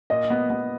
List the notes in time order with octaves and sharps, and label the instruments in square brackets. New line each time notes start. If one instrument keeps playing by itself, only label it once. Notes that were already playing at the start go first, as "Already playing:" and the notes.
[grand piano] A#2 [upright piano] D#5
[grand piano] B3
B3